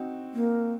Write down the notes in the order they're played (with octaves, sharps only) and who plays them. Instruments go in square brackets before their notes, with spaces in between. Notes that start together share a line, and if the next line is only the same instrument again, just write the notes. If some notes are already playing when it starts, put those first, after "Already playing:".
Already playing: [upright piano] C4 D#4 F#4
[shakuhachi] A#3